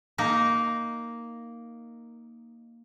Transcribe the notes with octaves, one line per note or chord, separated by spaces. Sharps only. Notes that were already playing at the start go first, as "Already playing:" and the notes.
A#3 D#4 A#4